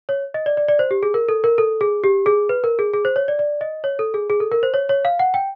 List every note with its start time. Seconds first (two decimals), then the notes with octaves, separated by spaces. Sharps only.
0.09 C#5
0.34 D#5
0.46 D5
0.57 D5
0.68 D5
0.79 C5
0.91 G4
1.03 G#4
1.14 A#4
1.29 A4
1.44 A#4
1.58 A4
1.81 G#4
2.04 G4
2.26 G#4
2.49 B4
2.64 A#4
2.79 G#4
2.94 G#4
3.05 C5
3.16 C#5
3.28 D5
3.39 D5
3.61 D#5
3.84 C#5
3.99 A4
4.14 G#4
4.30 G#4
4.40 A4
4.52 A#4
4.63 C5
4.74 C#5
4.89 C#5
5.05 F5
5.19 F#5
5.34 G5